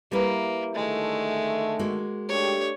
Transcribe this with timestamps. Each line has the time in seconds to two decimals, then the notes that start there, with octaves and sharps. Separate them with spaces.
0.12 G3 A#3 E4 B4
0.75 D3 D#3 G#3 A3
1.79 G#3 A#3 F#4
2.29 A3 D4 G4 C#5